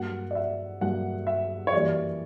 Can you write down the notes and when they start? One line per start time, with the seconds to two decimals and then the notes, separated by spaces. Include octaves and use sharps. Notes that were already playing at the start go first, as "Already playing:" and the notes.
Already playing: G2 F#3 A#3 F#5
0.31 D5
0.35 E5
0.81 G2 F#3 A#3 F#5
1.27 E5
1.67 C#5
1.72 F#2 E3 G3 A#3 D5